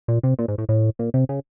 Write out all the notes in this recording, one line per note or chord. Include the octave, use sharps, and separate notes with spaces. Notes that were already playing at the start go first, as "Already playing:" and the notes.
A#2
C3
A#2
G#2
A2
A2
A#2
C3
C#3